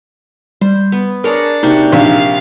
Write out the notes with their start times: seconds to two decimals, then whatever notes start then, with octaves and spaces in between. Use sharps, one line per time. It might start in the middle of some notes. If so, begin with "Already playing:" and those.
0.61 G3 C5
0.92 B3
1.24 D4 G#4 A#4 C#5 A#5
1.63 C3 A#3 D#4 F#4
1.92 A#1 E5 F5 G#5